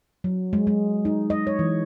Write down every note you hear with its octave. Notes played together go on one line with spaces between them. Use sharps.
F#3
G#3
G#3
D#4
D#5
C#5
E3